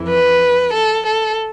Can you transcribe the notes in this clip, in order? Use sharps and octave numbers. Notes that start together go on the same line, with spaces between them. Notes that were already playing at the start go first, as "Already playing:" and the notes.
Already playing: F2 E3
B4
A4
A4